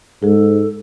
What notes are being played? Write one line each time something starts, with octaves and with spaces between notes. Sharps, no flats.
G#2 G#3 G#4 A4